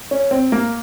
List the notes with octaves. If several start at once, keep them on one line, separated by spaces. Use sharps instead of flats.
C#4
C4
A#3